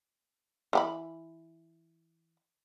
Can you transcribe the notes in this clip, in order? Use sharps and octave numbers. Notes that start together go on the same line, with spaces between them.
E3 G4 B5